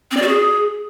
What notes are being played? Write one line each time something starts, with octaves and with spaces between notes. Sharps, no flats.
C4
D5
F#4
G#4